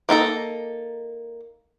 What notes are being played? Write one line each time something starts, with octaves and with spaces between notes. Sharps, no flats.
A#3 D#4 A4 A#5